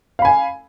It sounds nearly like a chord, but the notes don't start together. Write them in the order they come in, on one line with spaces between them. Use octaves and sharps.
F5 B5 G#5